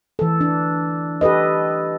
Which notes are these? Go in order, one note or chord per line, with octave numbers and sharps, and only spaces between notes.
E3 A4
D4
G4 A4 B4 D#5